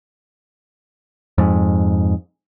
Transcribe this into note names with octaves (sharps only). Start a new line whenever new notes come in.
F2 G#2